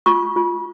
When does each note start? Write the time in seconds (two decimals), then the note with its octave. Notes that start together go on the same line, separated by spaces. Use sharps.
0.06 F4 C#6
0.36 F4